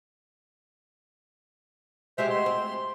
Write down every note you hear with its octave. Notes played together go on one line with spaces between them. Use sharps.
G#3 F#4 G4 C5 E5
C6
C4